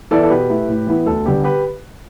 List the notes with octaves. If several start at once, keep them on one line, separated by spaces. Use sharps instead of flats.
E3 B3 E4 A4 D5
A4
B2 G4 B4
A3 E4
A2
E3 B3 E4
D2 A4
D3 G3 B3 G4
G4 B4